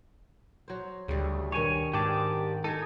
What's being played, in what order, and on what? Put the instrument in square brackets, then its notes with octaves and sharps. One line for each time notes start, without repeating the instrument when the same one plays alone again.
[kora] F#3 C5
[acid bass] D2 [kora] C#3 G3
[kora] G2 B2 [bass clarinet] D#3 [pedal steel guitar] C#5 G#5
[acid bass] G#2 [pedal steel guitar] G4 D5 A5
[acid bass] D#4 [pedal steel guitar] A4 G#5